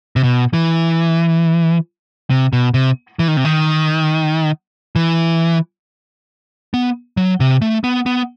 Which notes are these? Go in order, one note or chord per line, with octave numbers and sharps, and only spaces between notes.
C3
B2
E3
C3
B2
C3
E3
D#3
C3
D#3
E3
B3
F#3
C3
A3
B3
B3